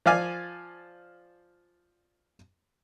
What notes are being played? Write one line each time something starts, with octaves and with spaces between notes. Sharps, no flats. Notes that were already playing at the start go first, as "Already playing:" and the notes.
F3 D5 F5 G#5